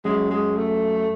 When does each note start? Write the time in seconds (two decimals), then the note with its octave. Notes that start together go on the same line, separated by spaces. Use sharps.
0.05 F#2 G#3
0.31 G#3
0.57 A3